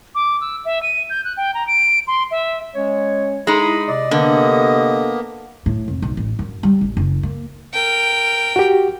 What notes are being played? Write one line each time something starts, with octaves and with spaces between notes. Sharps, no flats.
D6
E6
E5
D#7
G6
F#6
G5
A#5
D7
C6
E5
G#3 C#4 C#5
G#3 D#4 E4 B5
C3 D5 D#5
D3 A#3 B3
A2
F1
B1
A1
F#2
G3
A1
F#1
A#3
A#4 G5
F#4 G4